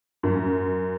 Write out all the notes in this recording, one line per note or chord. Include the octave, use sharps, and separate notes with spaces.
F#2